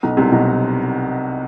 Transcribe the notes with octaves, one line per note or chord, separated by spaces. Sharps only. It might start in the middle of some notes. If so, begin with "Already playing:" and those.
B1 B2
C2 C3
B1 B2